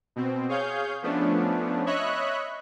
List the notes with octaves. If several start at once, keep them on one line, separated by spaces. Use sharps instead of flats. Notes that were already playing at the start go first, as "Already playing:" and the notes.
B2 C4
G#4 C#5 F5 G6
F3 A3 B3 C#4 D4
C#5 D#5 E5 B5 C#6 F#6